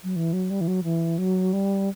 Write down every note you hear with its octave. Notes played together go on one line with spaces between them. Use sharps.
F#3
E3
F#3
G3
E3
F#3
E3
F#3
G3